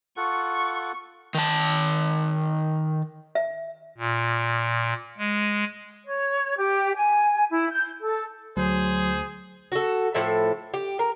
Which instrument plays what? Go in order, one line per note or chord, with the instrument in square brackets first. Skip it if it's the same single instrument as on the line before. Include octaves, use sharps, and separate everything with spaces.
[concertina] F4 A4 F#5 [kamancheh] C#6
[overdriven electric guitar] D#3 A5
[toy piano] E5
[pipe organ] A#2
G#3
[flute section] C#5
G4
G#5
E4
G6
A4
[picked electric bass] D2 [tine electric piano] F#3 [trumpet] G#4 [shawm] C5
[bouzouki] F#4 A4
A2 F3 A4 E5
G4
A#4